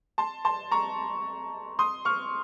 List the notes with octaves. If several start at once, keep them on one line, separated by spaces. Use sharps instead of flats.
A5 C6
A5 C6
A#5 C#6
C6 D#6
C#6 F6